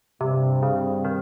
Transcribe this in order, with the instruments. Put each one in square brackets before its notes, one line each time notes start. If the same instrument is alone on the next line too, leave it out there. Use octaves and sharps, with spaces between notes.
[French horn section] G2 G3 C4 [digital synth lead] C3
[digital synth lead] C#3
D#3